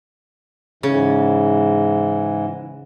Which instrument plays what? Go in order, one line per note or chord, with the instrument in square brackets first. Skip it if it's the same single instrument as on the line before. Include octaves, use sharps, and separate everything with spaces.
[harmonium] G#2 E3 [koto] C#3